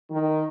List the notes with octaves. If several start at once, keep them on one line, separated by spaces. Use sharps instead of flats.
D#3